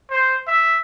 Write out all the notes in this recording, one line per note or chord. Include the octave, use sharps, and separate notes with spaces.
C5
E5